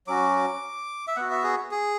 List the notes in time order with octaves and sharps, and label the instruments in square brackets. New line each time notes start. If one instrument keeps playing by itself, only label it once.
[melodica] F#3 C#4 F#4 D6
E5
B3 F#4 F#5
E5
G#4
G#4